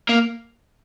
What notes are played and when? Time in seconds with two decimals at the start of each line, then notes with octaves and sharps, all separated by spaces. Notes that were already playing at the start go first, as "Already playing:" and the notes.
0.09 A#3